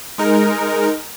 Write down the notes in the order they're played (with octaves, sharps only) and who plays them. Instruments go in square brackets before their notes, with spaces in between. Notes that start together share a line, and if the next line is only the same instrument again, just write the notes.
[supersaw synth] G#3 D#4 A#4